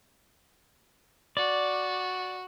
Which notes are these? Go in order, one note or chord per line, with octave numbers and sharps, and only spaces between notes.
F#4 D5